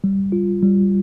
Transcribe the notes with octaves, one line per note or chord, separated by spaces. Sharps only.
G3
F4
G3